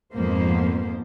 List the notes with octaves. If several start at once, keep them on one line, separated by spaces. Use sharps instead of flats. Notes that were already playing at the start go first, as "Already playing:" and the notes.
F2 G#2 F3 A#3 B3 C5